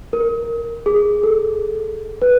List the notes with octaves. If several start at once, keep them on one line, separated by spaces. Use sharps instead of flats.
A#4
G#4
A4
B4